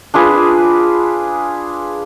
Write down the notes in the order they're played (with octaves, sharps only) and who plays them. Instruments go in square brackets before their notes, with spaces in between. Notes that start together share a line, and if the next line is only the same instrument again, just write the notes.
[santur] D4 F4 G#4 B4